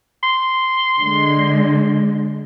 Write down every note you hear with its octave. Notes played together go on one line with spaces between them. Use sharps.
C6
D3 G#3